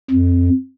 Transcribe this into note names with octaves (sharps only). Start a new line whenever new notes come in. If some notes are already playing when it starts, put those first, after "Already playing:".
F2